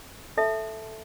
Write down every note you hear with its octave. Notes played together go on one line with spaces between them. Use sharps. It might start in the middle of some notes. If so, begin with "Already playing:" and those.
A4 E5 A5